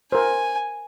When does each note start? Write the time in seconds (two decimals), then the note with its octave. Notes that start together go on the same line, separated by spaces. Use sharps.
0.12 A#4 C5 G#5